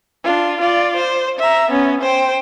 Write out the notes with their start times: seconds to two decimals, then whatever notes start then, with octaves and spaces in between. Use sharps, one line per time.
0.24 D4 F4
0.61 F4 D5
0.97 C5
1.39 E5 A#5
1.71 B3 C#4
2.02 C5 G5